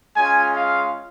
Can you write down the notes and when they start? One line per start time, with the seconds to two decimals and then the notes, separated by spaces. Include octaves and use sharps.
0.16 G#3 C#4 F4 G#5
0.55 F5